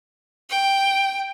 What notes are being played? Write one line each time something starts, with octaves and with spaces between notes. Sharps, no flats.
G5